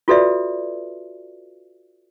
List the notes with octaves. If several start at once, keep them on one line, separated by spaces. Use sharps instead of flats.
F4 F#4 A4 B4 D5 E5